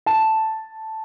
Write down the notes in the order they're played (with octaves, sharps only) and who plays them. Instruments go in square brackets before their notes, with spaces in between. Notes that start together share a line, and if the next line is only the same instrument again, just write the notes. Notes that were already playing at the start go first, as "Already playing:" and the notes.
[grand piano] A5